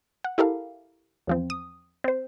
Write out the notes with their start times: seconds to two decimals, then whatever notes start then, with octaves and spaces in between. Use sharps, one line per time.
0.24 F#5
0.38 E4 G4 A4 A#4 F5
1.27 E2 F3 C4
1.50 D#6
2.04 C4 C5